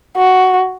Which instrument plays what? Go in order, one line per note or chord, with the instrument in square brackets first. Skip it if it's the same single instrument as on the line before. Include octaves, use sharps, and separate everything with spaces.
[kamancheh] F#4